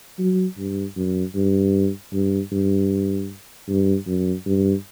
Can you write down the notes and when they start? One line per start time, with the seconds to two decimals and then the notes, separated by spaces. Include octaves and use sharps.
0.19 F#3
0.58 G2
0.96 F#2
1.35 G2
2.13 G2
2.52 G2
3.68 G2
4.07 F#2
4.46 G2